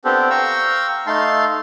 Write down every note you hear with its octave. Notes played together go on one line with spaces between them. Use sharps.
B3 C4 D4 G4 A4 C5
F5 G5 A#5 C#6 E6 F6
A3 D#4 F5 A5 C6